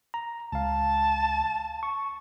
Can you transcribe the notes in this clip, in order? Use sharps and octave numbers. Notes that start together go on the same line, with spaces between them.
A#5
C#2 F5 A5
C#6